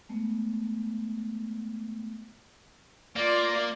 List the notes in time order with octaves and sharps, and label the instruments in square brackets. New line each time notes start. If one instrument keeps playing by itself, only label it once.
[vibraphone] G#3 A3 B3
[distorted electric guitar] A#3 [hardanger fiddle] F4 D5